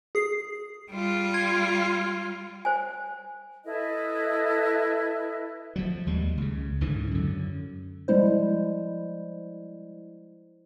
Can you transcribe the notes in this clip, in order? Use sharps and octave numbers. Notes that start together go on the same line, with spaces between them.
G#4 C7
G3 F4
G#6
C5 G#5
E4 A4 B4 D#5
F3 F#3
D#2 G3 G#3
C#2 C#3
C#2 G#2 D3 E3
F#2 D3
F3 G3 G#3 E4 C5